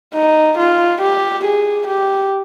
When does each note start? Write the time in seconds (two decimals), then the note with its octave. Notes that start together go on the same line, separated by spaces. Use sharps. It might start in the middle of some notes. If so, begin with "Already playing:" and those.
0.14 D#4
0.58 F4
1.02 G4
1.45 G#4
1.88 G4